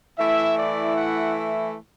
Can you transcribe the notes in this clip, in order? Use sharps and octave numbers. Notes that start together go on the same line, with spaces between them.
E3 A3 E4 E5
D5
F#5